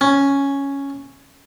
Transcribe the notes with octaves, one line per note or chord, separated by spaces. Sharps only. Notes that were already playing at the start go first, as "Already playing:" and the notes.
C#4